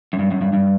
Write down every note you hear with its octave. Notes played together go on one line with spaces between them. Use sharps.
F#2
G2
F#2
G2
G2